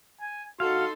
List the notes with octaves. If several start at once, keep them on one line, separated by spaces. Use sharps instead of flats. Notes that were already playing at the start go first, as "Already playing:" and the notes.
G#5
D#4 F#4 A4 F5 C6